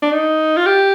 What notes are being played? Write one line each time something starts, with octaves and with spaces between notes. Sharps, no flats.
D4
D#4
F4
G4